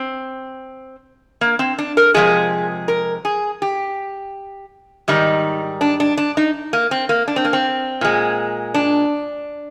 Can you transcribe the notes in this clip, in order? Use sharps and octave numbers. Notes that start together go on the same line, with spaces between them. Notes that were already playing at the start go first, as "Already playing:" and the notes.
Already playing: C4
A#3
C4
D4
A#4
C3 F3 G#3 G#4
A#4
G#4
G4
G#2 D#3 G3 D#4
D4
D4
D4
D#4
A#3
C4
A#3
D4
C4
A#3
C4
A#2 G#3
D4